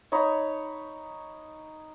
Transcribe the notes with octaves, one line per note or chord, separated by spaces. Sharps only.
D#4 C#5 B5